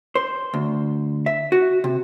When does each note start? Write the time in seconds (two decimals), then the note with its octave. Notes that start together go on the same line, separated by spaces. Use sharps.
0.15 C5
0.54 D2
1.26 E5
1.52 F#4
1.84 C3